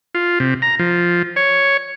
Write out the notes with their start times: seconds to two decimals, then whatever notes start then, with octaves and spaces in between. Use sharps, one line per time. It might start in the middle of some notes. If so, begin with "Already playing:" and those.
0.15 F4
0.40 C3
0.62 A#5
0.79 F3
1.36 C#5